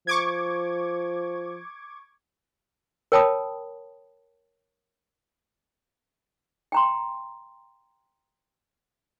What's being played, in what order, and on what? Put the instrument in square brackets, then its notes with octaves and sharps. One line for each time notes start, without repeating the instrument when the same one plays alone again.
[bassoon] F3 [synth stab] C#6 D6 G#6
[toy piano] A#4 C#5 G5 A5 B5 D#6
G5 A#5 C6